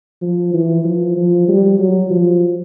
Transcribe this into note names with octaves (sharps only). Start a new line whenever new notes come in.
F3
E3
F3
F3
G3
F#3
F3